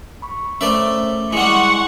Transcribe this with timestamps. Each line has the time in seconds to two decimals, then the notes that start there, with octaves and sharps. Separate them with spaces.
0.22 B5 C#6
0.61 A3 C#4 A#4 C5 D5 E5
1.33 G3 G#3 E4 F#5 C6 C#6